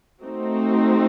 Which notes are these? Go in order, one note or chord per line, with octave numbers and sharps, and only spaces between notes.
A3 C4 D#4 F#4